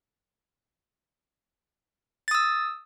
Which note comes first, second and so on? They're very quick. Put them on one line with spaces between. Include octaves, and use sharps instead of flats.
A6 D#6 E6